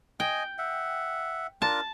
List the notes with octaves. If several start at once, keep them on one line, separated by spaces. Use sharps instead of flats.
D#5 G5 G#5
E5 F#5
D4 F4 A#4 A5